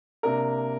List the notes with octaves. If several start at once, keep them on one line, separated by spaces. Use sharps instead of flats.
C3 A#3 D4 A#4